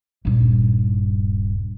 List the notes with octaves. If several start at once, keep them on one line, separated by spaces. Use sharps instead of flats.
D#1 G2